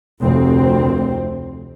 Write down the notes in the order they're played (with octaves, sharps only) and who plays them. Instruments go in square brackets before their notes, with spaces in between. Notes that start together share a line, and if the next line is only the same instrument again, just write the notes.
[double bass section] F1 D2 C4